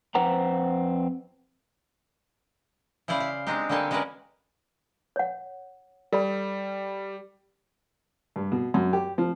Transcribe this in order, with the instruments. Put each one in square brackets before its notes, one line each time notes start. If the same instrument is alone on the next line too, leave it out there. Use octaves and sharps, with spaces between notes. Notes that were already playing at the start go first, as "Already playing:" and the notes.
[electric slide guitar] F2 C4 B4 C5 F#5 A#5
[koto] C#3 E4 C5 D5 F5
F5
G#3 C4 D4 D#4 G4
D3 G3 A#3 G4 A4 G#5
G#3 C#4 F#4 A#4 B4 D5
[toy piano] C#5 F#5
[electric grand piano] G3 [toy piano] A4 D5 B5
[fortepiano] G2
B2
F#2
G4
F3